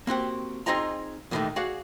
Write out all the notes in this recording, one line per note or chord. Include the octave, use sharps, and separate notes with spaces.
A#3 C4 F#4 G4
C4 D#4 F4 G#4 D#5 A#5
D#2 A2 D#3 E3 A3 D#4
F#4 G#4 D5 F5 F#5